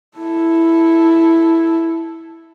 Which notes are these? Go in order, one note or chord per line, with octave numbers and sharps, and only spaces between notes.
E4 A4